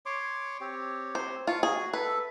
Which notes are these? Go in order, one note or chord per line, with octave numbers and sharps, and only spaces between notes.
C#5 C6 D6
C4 G4 C#5
C5
F4 F5 A5 C#6
F#4 G#4
A4 B4 E5